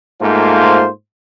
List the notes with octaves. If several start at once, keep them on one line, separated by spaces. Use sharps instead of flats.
G#2 A3 A#3 F4 C5